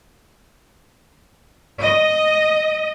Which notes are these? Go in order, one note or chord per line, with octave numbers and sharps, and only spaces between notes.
D#5